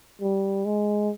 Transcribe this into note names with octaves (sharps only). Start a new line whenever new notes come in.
G3
G#3